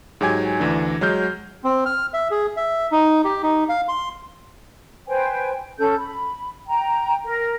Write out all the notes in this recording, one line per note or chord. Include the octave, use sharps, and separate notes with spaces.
G#2 F#3 G4 G#5 G#6
D2 E3 D4
F#3 G#3 F6 G6
C4
F6
E5
G#4
E5
D#4
G4
D#4
F5
C6
B4 C5 G5 G#5
C#4 A4 G6
B5
G5 A#5
A#4